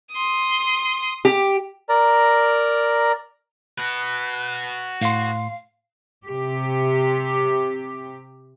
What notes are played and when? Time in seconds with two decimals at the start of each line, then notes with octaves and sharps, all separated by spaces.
0.13 C6 D#6
1.25 G4
1.89 A#4 D5 A#5
3.78 F#4 B4 F#6
5.01 A2 F5 C6
6.26 C3 G4